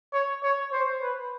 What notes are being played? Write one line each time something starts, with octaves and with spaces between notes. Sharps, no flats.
C#5
C#5
C5
B4